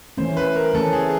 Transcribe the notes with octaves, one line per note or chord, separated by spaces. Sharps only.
E3 A3 C#4 C5
B4
A#4
E3 A3 C#4 A4
G#4